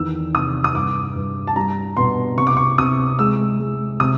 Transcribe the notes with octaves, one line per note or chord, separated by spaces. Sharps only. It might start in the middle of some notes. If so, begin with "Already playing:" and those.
Already playing: E2 D#3 E6
C3 D#6
D#6
G2 D6
G2
A5
G3 A#5
B2 C6
C3 C#6
D6
C#6
C3 D#6
G#3 E6
G#3
C3 D#6